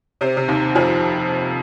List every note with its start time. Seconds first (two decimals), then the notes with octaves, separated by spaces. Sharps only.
0.21 C3 C4
0.37 C3
0.48 D#2 D#3
0.75 F2 F3